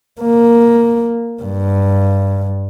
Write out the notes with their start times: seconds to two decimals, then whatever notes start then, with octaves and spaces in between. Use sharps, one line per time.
0.21 A#3
1.42 G2